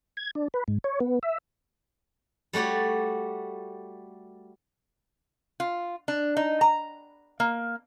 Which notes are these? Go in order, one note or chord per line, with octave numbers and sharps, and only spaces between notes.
G#6
D4
B4
G#2
C#5
B3
E5
G3 A3 F#4 C#5 D5
F4
D4
D#4
A#5
A#3